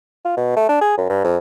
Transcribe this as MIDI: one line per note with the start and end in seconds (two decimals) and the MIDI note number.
0.25 0.36 65
0.37 0.53 47
0.56 0.66 57
0.69 0.77 62
0.81 0.96 68
0.98 1.05 42
1.10 1.21 43
1.24 1.37 41